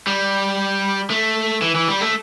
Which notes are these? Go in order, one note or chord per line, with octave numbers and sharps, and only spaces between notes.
G3
A3
E3
E3
G3
A3